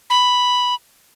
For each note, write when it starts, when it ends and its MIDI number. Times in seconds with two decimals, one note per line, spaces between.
0.10 0.75 83